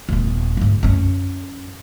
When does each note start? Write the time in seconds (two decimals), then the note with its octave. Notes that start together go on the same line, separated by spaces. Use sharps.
0.09 D#1 B3
0.57 G#2 D3
0.83 F#2 C#4